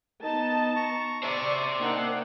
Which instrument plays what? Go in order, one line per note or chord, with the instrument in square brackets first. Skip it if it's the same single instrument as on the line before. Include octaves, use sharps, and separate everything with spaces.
[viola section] B3 A5 [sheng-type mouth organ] D#4 D#5
[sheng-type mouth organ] A#5 C#6
[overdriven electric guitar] C5 E5 [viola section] D5 [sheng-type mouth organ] C#6 D6
[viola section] A#3 D#4 F#5 [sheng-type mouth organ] D4 G5